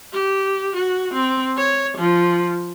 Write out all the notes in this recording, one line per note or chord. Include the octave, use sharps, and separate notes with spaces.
G4
F#4
C4
C#5
F3